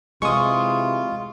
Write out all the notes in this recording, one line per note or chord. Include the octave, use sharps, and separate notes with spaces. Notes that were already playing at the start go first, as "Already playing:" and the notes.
C3 E3 G#3 F4 G#4 C#6 D#6